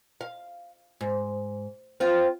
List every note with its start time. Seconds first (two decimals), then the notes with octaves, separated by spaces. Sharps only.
0.21 F5
1.01 G#2
2.00 C4 F4